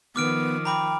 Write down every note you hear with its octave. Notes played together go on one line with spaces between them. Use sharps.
D#3 F3 B3 D6 F6 D7
G5 A#5 B5 D6